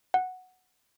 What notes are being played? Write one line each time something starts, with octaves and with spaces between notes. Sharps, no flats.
F#5